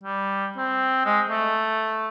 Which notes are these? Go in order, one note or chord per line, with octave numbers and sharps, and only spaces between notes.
G3
C4
G#3
A3